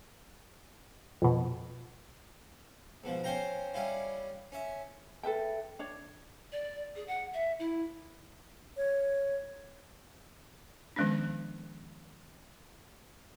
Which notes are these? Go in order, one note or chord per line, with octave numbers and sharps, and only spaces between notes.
F2 B2
G#2 B2 F3
C#4 C5 F5 G5 A#5
G3 C#4 E4 F4
C#4 E5
A4 B4 E5 G5
D4 C#5
D5
G#4
F#5
E5
E4
C#5
D#3 F3 G#3 B3 C#4 D4